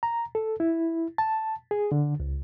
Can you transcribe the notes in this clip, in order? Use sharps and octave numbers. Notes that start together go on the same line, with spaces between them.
A#5
A4
E4
A5
G#4
D3
C#2